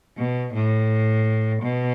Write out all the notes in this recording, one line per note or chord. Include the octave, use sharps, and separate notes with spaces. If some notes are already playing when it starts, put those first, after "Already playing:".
B2
A2
B2